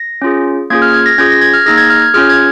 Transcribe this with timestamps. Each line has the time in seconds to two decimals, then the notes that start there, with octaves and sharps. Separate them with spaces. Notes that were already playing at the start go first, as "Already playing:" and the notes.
Already playing: A#6
0.22 C#4 F4 G#4
0.70 A#3 C#4 F4 G#4 G#6
0.82 F6
0.94 G#6
1.06 A#6
1.18 C#4 F4 G#4 G#6
1.30 A#6
1.41 G#6
1.54 F6
1.66 A#3 D#4 G#4 A#6
1.78 G#6
1.90 F6
2.02 G#6
2.14 C#4 F4 G#4 F6
2.30 G#6